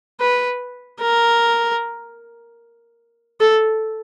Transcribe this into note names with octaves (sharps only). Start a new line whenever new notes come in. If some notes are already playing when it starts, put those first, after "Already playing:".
B4
A#4
A4